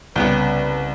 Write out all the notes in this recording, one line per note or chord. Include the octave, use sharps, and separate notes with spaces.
C2 C#3 B3 B4 G5